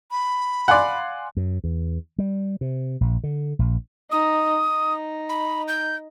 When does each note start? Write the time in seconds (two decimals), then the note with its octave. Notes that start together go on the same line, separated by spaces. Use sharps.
0.11 B5
0.68 D5 F5 F#5 G#5 C6
1.37 F#2
1.64 E2
2.18 G3
2.61 C3
3.01 A#1
3.24 D3
3.59 A#1
4.11 D#4 D#6
4.69 D#4
5.29 B5
5.68 G6